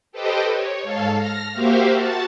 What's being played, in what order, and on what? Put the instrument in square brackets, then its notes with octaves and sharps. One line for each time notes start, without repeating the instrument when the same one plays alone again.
[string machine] G4 A4 B4 C5 D#5 G5
C#5
G#2 A4 F5 A5
F6 A#6
A#3 F#4 G4 C5 E5 F5
F#4 A5 A6